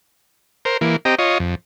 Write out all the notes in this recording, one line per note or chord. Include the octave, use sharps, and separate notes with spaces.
A#4 C5
E3 A#3
C4 G4 D#5 A#5
F4 C#5 D#5
F2